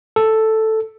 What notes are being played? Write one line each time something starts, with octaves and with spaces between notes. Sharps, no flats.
A4